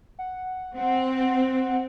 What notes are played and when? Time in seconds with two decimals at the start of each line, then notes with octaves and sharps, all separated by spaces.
0.19 F#5
0.77 C4 F#5